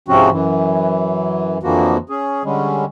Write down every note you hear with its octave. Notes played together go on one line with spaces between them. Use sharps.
G#2 C3 F3 C4 C#4 F#4
F#2 E3
F2 D3 E3 F3 A#3 F#4
C#4 G#4
D3 G3 G#3 C#4